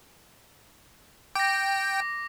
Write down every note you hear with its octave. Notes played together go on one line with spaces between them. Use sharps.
G5 D6 A#6